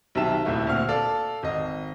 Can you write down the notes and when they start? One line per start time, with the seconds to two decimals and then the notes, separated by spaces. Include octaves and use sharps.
0.15 B1 C3 D#3 E5 A5 E7
0.45 D#1 C2 A3 E4
0.67 D2 A#2 C4 F6
0.88 A4 D5 F5
1.43 G#1 D#5